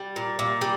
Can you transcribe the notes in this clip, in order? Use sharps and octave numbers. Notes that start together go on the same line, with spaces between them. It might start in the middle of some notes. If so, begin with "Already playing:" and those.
Already playing: G3
A#2
A#2
G3